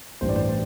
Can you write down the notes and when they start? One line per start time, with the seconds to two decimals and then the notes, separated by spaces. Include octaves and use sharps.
0.21 A1 G2 E3 G3 C5
0.29 D5
0.36 C5